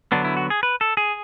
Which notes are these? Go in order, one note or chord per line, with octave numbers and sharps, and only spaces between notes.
D3 F#3 B3 D4
E4
F#4
G#4
B4
A4
G#4